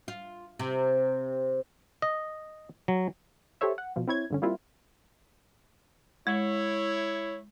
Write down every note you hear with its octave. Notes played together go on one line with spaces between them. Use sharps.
F4
C3
D#5
F#3
G4 A4 C5 C#5 E5
F#5
B2 F3
C4 E4 C#5 G#6
G2 D3 C#4
G3 A#3 C4 E4 F4
G#3 E4 C#5